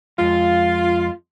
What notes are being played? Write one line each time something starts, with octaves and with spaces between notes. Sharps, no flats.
F2 G#3 F4